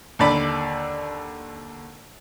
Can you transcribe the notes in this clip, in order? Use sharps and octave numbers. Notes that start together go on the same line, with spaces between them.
D#2 D3 D5 B5